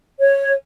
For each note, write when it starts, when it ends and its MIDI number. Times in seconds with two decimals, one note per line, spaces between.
0.19 0.53 73